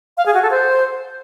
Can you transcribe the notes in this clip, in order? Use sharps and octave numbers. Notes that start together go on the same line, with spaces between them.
F5
G#4
F#4
A4
C5